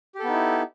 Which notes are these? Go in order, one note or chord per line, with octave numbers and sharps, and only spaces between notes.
B3 D#4 E4 G4 A4